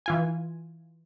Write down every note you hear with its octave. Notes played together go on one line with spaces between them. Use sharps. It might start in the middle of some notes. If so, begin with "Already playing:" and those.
E3 F4 G#5